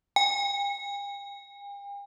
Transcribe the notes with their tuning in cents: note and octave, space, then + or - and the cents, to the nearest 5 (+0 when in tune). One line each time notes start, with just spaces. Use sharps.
G5 +45